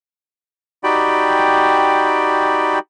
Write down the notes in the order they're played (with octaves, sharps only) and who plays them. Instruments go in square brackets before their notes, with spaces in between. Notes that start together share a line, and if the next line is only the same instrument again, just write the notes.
[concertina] D#4 F#4 G4 D5 G5 B5